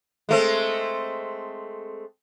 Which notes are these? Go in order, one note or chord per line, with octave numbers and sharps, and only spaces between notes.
G#3 A3 C4